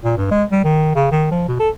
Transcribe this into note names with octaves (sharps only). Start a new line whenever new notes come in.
A#2
G2
G#3
G3
D#3
C#3
D#3
F3
B2
A4